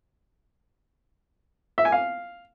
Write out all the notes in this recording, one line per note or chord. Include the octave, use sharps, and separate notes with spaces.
E5
G#5
F5